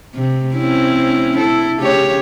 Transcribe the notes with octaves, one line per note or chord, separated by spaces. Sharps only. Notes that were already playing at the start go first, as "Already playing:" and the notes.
C3
C4 C#4 E4
E4 A4
C#3 G4 C#5